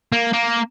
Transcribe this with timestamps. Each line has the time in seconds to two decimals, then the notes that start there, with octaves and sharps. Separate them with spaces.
0.12 A#3
0.33 A#3